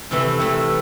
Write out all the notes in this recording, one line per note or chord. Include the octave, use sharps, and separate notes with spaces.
C3 E3 A3
C3 E3 A3